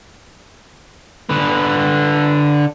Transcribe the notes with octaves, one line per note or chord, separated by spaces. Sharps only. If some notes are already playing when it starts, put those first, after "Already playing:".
D3 B4